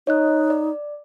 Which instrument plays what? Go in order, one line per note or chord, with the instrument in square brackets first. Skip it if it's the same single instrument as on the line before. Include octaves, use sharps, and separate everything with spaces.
[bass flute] D#4 [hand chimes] C#5 D#5 F#6
[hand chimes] D5